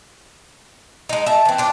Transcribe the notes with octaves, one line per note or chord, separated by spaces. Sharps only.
G#3 D#4
E5 A5
E3 C4
D4 F4